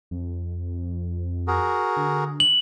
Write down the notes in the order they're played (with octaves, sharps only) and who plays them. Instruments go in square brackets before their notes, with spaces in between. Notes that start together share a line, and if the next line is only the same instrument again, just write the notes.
[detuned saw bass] F2
[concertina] F#4 G#4 A#4
[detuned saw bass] D3
[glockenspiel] F#7